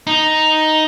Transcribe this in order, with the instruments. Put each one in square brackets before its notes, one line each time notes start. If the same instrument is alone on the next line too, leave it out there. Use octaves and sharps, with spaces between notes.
[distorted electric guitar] D#4